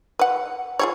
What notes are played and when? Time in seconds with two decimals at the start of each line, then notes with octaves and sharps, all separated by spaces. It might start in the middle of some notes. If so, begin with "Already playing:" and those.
0.19 B4 F#5
0.79 F4 G#4 C#5